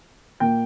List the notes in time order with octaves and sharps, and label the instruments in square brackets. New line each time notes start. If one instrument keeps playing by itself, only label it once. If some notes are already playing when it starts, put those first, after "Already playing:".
[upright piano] A#2 A#3 G5